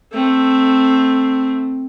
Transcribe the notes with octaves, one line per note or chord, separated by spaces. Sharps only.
A3 C4